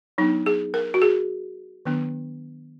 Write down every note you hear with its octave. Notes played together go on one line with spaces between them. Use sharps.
F#3 B3 D4 D#4
G#4
A#4
F#4
G#4
D#3 F#3 B3 D4